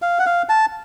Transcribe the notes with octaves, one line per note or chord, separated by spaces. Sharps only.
F5
F#5
F5
A5